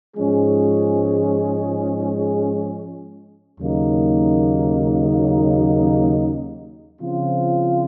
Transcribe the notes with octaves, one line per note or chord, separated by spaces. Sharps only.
G#2 F3 G#3 C#4 G#4
D#2 C#3 F#3 A#3 D#4
C#3 F3 C4 F4